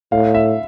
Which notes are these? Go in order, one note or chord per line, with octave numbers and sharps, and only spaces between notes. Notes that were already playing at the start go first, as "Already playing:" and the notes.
A2 F5
E5